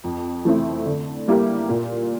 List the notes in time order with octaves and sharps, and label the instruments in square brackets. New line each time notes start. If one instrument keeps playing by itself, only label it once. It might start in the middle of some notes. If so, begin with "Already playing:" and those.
[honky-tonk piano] F2
E3 A3 C4 E4
D3
G3 A#3 E4 G4
A#2